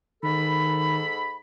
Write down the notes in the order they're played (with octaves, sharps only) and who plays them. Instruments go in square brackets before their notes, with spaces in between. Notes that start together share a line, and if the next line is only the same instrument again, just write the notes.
[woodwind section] G#2 A4 B5 [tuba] D#3